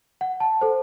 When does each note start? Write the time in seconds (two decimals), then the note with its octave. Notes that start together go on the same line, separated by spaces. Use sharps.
0.21 F#5
0.40 A5
0.61 A4 C5